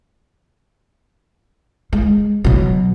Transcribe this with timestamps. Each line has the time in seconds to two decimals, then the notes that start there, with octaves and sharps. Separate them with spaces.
1.93 G#3
2.44 B2 F#3